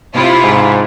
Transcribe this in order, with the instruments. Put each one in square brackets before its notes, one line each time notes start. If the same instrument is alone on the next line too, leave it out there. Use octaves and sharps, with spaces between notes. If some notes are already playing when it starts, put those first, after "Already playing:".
[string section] C3 E4 F4
[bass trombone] G#2